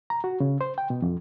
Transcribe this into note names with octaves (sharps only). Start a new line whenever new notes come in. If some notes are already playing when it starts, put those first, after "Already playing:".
A#5
F#4
C#3
C5
G5
B2
F2